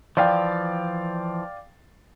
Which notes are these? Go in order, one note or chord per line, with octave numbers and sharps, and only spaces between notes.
E3 F3 D5 F5 G5